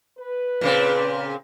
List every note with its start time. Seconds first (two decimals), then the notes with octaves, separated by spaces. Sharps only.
0.18 B4
0.61 A#2 C#3 C4